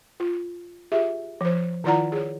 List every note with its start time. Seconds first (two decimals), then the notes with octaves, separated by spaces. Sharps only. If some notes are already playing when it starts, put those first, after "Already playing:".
0.20 F4
0.92 F4 G4 G#4 E5
1.41 F3 C5
1.84 D#3 E4 F4 D5 F#5 A#5
2.12 G#4 C#5